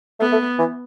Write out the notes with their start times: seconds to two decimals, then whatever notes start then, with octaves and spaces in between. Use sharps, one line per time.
0.20 A3 B3
0.32 A3
0.59 E3